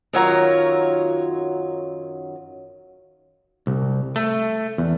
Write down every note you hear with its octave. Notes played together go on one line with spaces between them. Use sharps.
F#2 D#3 F#3 F4 C#5 A#5
C2
A3
E2